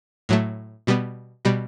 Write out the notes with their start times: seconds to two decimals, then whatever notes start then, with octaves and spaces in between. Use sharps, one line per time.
0.29 A2 F#3 A3
0.87 B2 G3 B3
1.45 B2 G3